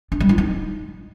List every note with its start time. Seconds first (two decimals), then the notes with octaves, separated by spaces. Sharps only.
0.12 D4
0.20 G3
0.29 E4
0.38 D#4